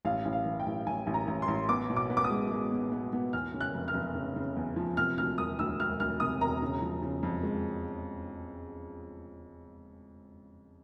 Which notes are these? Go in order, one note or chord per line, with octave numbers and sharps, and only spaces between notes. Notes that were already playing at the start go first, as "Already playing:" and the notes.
A1 F5
A1
F5
E3
G5
A1
A1 G#5
A1
A#5
A1
C6
A1
B3 D6
B2
D6
B3
D6
D#6
G#3
G#3
B3
B3
B3
E2 F6
C#3
F#6
F1
F6
F1
C#3
C#3
E2
F3
C3 F6
D2 F6
E1 D#6
D2 E6
E1 F6
D2 F6
C3 D#6
E1 A#5
C#3
F3
C#3
F2
G#3